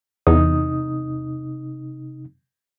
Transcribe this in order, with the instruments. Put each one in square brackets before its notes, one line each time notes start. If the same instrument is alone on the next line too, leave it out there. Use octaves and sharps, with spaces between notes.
[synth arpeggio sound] E2 [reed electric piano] C3 D#4 D#6